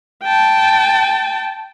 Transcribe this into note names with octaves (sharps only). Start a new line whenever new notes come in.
G5 A5